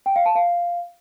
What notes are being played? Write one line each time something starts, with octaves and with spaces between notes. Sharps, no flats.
G5
F5
A5
F5